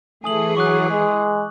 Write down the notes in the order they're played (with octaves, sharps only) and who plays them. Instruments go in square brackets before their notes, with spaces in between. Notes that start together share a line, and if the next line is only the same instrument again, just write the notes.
[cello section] E3 G#4 [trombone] A3 [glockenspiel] G#5 D#6 F#7
[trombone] F#3 [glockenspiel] C#6 D6 F#6
[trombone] G#3